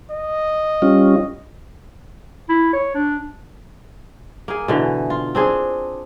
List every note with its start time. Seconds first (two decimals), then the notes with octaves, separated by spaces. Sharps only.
0.11 D#5
0.82 G3 C#4 F4
2.49 E4
2.73 C#5
2.94 D4
4.48 A#3 G#4
4.68 B2 D3 E3
5.10 F4
5.35 C4 D4 G#4